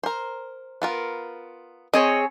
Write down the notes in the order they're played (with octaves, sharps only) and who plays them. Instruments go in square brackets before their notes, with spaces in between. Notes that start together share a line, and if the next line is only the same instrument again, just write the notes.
[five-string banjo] A#4 C5
B3 F4 A#4
[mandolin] C4 G#4 C#5 [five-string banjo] D#5